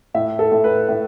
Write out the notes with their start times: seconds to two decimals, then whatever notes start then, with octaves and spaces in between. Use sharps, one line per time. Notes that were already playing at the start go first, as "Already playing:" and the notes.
0.14 A2 E5
0.39 A4
0.52 A2
0.64 B4
0.89 A2 B4